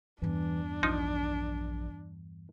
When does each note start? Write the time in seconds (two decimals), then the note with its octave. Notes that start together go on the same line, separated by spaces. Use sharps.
0.22 E2 G2 E3 D4
0.83 A#1 F3 D#4